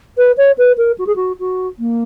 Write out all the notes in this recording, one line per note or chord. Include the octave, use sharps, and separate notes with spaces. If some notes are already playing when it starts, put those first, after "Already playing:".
B4
C#5
B4
A#4
F#4
G#4
F#4
F#4
A#3